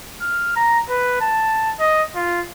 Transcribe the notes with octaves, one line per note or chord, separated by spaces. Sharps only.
F6
A#5
B4
A5
D#5
F4